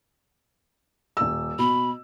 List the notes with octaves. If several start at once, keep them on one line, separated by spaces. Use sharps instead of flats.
D#1 E6
B2 B5